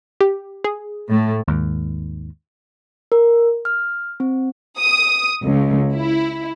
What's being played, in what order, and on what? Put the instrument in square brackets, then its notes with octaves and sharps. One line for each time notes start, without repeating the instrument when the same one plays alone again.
[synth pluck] G4
G#4
[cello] A2 A3
[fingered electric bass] D#2 G#2
[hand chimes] A#4
F6
C4
[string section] D#6
C#2
E4